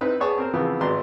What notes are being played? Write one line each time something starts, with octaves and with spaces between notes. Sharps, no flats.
C4 D#4 E4 B4 B5
B3 G#4 C#5 D5 A5
C4 A#4 C5
C#3 E3 F3 B3 C4
G#1 B4 D5 A#5 C6